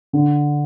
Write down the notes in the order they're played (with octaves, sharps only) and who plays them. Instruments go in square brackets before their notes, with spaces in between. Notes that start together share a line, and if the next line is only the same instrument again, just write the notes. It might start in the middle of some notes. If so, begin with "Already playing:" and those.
[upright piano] D3